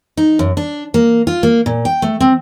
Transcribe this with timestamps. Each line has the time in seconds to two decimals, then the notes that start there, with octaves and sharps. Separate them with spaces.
0.17 D#4
0.39 F#2
0.57 D4
0.94 A#3
1.27 F4
1.43 A#3
1.66 A#2
1.85 G5
2.02 A3
2.20 C4